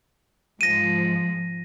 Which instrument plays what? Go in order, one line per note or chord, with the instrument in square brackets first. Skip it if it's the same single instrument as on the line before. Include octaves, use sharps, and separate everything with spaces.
[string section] G#2 F3 [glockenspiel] A#6 D#7